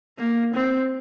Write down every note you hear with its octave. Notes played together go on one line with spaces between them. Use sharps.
A#3
C4